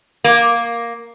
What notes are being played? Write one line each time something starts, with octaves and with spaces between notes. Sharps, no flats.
A#3